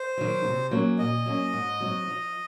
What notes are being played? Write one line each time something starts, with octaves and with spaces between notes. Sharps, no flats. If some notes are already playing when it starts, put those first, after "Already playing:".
Already playing: C5
D#3 F#3
C3
F#3 A#3 C#4 F#4
A#2 D#5
F#3 A#3 C#4
G#2
F#3 C4 D#4 F#4
F3